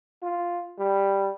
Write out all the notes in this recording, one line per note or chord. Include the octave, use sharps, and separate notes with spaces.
F4
G3